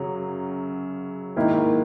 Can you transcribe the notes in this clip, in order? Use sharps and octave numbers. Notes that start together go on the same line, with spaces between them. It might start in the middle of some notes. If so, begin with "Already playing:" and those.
Already playing: F#2 C#3 F#3
G#2 D#3 A#3 E4